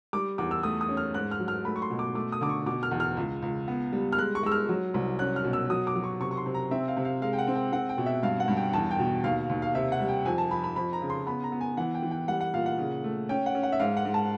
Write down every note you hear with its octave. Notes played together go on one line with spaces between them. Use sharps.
G3 D6
E2 D6
E6
A3 D#6
D#6
C#4
F6
G#2 F#6
F6
F#3
F6
A3 B5
C#6
C6
B2
D6
A3 D6
D#6
D3 D6
C#6
B2 D6
F6
E2
F6
C#2
C#2
B3
G3
F6
G#3 F#6
C#6
G#3 E6
F6
F#3
C2
C#4 F#6
F6
B2
E6
F#3 D#6
D6
F#3
C#6
C3 C#6
C#6
C6
C3
A#5
C4 E5
F5
C3
F5
G#3 F5
G5
F#5
C4
G5
C4 F#5
G5
B2
E5
G2 F5
F#5
G2
G5
E2 A5
G5
B2
D#2 F5
D#2
F5
C3 E5
F#5
G3
G5
F2 G#5
A5
F3 B5
B5
F2 B5
A#5
C#3
C6
B3 B5
A#5
B3
G#5
E3 F#5
G5
E3
G5
G3 F#5
F#5
A#2 F5
F#5
C#3
A3
C#4 G5
F#5
C#4
F#5
E5
G#2 F5
F#5
G#2
A5